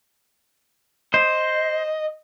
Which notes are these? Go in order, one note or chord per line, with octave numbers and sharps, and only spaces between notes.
C5 D#5